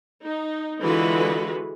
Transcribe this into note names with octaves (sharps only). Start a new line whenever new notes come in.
D#4
D3 E3 G#3 F4 F#4 B4